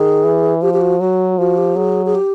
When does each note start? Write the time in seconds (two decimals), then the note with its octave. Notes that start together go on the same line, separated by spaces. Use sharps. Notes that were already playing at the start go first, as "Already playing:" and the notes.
Already playing: D#3 G#4
0.24 E3
0.62 F3 G4
0.73 G4
0.81 F#4
1.00 F#3 F#4
1.38 F3 F#4
1.57 G4
1.76 F#3 G#4
2.06 G#4
2.15 G4